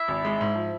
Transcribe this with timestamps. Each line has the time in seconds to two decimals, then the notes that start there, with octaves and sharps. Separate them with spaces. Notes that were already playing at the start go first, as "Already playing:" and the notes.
Already playing: E4 E5
0.08 G#1
0.25 G#3
0.41 G#2
0.56 F3